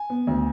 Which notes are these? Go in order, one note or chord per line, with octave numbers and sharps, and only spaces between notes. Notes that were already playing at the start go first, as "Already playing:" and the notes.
Already playing: G#5
B3
D2